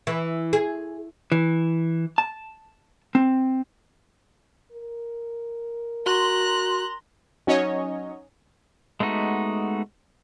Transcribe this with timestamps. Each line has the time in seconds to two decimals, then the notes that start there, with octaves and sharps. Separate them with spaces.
0.07 E3
0.53 G#4
1.32 E3
2.18 A5
3.15 C4
4.72 A#4
6.06 F#4 A#5 C6 F#6
7.47 F#3 C#4 D#4 C#5 D#5
9.00 G#3 A3 B3 D#4 F#4